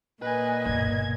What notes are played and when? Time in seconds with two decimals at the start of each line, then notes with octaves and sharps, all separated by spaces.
0.21 A#2 B4 D#5 G#5
0.66 G1 B2 G#6